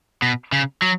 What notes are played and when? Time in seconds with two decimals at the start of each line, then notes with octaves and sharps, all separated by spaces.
0.22 B2
0.52 C#3
0.82 F#3